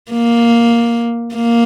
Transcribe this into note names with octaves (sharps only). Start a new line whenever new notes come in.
A#3
A#3